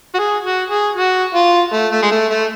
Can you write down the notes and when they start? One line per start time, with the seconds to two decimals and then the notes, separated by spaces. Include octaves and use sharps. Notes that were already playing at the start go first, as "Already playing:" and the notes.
0.14 F#4
0.19 G#4
0.45 F#4
0.70 G#4
0.96 F#4
1.34 F4
1.73 A3
1.92 A3
2.02 G#3
2.11 A3
2.31 A3